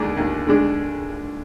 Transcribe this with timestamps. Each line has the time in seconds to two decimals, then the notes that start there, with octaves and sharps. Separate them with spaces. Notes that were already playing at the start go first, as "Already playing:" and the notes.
Already playing: D#2 D3 G#3 D4
0.17 D#2
0.47 D3 G#3 D4